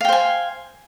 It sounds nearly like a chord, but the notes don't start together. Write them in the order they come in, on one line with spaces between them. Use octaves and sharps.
F5 G5 C5 G#5